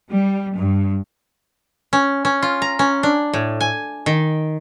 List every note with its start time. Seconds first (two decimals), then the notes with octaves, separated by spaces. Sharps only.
0.12 G3
0.58 G2
1.93 C#4
2.25 C#4
2.42 F4
2.62 A#5
2.79 C#4
3.03 D4
3.33 A2
3.61 G#5
4.06 D#3